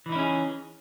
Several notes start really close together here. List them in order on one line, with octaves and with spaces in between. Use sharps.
E3 D#4 E4 C#4 G#4